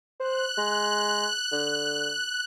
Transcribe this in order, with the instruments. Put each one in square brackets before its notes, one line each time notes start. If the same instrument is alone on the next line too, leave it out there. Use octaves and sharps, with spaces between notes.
[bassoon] C5 [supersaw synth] F#6
[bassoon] G#3
D3